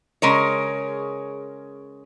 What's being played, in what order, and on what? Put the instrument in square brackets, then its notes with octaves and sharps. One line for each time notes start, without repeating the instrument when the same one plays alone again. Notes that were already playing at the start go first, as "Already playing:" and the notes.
[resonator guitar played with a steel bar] C#3 G#3 A#4 C#5